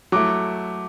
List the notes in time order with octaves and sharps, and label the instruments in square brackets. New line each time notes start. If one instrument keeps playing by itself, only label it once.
[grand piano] F#3 A3 E4 [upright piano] D6